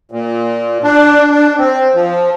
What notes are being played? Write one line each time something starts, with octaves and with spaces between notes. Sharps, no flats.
A#2
D4
D4
C4
F3